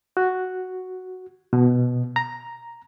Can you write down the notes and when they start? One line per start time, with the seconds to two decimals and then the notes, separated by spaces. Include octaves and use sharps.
0.17 F#4
1.53 B2
2.16 A#5